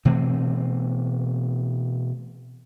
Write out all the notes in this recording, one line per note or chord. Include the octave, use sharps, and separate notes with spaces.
B2 E3 A3 C4